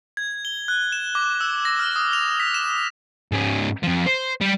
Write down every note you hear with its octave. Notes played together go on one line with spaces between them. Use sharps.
G#6
G7
F#6
E7
D6
E6
A#6
F6
D#6
F7
B6
E7
G#2 C#4
F2 F3
C5
G3